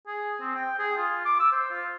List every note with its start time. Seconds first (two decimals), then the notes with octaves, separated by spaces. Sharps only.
0.07 G#4
0.41 C4
0.55 G5
0.79 G#4
0.97 F4
1.25 D6
1.40 E6
1.52 C5
1.70 F4